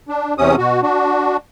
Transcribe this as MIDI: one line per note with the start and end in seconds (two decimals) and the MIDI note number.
0.08 0.34 62
0.38 0.56 40
0.38 0.56 48
0.38 0.56 61
0.38 0.56 87
0.58 0.82 47
0.58 0.82 66
0.83 1.37 62
0.83 1.37 66